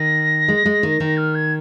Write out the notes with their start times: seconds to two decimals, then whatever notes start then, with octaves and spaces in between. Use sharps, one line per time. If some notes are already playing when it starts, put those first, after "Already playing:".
Already playing: D#3 A#6
0.48 G#3
0.66 G#3
0.83 D#3
1.00 D#3
1.17 F6
1.35 G#6